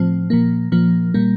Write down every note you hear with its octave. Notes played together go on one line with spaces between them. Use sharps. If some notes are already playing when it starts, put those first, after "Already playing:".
Already playing: A2 F3 C4
A#2 F3 A#3
A#2 F3 A#3
A#2 G3 A#3